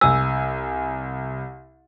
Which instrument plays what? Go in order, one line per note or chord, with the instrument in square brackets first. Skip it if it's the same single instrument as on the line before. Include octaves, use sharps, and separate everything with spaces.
[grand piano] C2 G#5 [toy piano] E6